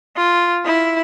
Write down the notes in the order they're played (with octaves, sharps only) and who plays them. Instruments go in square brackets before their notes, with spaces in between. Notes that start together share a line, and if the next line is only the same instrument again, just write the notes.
[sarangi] F4
E4